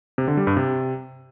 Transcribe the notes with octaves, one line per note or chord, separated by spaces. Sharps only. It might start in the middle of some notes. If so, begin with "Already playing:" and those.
C3
D3
G3
G2
C3